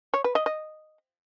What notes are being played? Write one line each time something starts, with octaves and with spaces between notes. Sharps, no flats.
C#5
B4
D#5
D#5